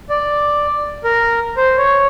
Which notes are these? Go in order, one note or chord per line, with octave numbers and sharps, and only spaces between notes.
D5
A#4
C5
C#5